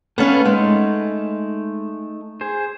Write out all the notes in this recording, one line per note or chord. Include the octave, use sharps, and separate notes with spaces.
A#3 B3 C#4 A4 B4 F5
G#3 A3 D#4
G#4 C5